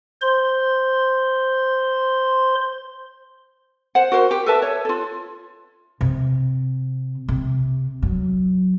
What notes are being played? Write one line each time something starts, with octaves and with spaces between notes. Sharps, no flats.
C5 C6
C5 F#5
F#4 A#4 C5
G4
A4 B4 E5 A5
C#5
F4 A4
C3
C3
F#3